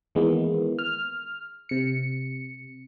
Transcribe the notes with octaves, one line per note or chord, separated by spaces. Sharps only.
D#3 E3 G#3 A#3 B3
F6
C3 C#7